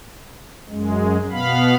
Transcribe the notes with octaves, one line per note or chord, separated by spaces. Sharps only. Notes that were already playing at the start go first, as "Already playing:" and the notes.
F#2 G#3
B2 B3 F5 B5